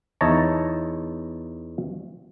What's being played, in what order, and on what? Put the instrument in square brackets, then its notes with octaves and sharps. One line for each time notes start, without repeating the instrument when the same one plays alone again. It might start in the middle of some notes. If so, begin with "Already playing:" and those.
[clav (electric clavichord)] E2 D#4 E4 C#5 A5 A#5